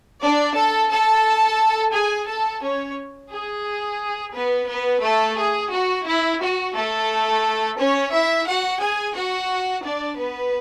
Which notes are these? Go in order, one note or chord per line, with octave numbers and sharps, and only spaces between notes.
D4 D5
A4 A5
A4 A5
G#4 G#5
A4 A5
C#4 C#5
G#4
B3 B4
B3 B4
A3 A4
G#4
F#4
E4
F#4
A3 A4
C#4 C#5
E4 E5
F#4 F#5
G#4 G#5
F#4 F#5
D4 D5
B3 B4